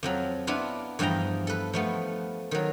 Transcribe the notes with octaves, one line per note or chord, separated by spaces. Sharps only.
F2 F3 F#3
B3 D4 E4 F4 B4
E2 G2 F3 G#4 G5 A#5
A4 B4
F3 A3 B3
D#3 F#3